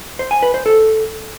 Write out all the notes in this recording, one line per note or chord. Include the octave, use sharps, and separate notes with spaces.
C5
G#5
B4
C5
A4